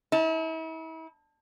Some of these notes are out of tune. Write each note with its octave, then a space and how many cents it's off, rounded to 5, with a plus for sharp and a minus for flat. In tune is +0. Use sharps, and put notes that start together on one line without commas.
E4 -40 A5 +5